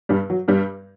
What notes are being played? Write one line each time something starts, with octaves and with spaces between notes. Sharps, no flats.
G2 G3
F#3
G2 G3